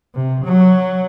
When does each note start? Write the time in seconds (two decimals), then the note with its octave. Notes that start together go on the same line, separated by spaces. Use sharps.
0.15 C3
0.45 F#3